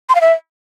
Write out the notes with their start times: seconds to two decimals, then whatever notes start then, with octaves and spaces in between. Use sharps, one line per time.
0.09 C6
0.15 F5
0.21 E5